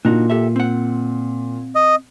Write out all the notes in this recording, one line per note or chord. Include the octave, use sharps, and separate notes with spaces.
A#2 D4 D#4 F#4
G4 A4 E5
C4 F#5
D#5